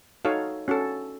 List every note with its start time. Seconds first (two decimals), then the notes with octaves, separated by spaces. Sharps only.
0.25 D#4 F#4 A4 C#5 F5
0.68 C#4 F#4 A4